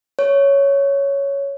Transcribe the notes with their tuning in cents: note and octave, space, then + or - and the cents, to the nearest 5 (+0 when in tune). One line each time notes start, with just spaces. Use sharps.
C#5 +5